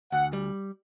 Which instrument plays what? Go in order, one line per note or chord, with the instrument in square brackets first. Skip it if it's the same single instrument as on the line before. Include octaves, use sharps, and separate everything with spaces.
[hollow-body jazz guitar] D2 [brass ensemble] F#5
[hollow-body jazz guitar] G3